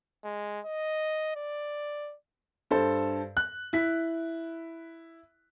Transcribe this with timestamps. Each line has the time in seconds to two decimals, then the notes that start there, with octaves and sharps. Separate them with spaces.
0.24 G#3
0.65 D#5
1.36 D5
2.71 G2 A4 C5
3.37 F#6
3.73 E4 B6